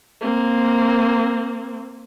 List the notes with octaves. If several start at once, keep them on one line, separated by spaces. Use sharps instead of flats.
A#3 C4